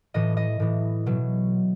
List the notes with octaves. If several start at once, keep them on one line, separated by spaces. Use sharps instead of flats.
A2 E3 D#5
D#5
A2 E3
B2 F#3